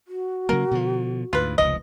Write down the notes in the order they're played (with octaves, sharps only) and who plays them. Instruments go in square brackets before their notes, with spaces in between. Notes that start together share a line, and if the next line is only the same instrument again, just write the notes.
[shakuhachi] F#4
[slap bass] C#3 F#3 A#3 [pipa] A#4
[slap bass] B2 D3 F3
[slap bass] D2 G#2 [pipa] F4 B4
[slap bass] F1 C#2 F3 [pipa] D#5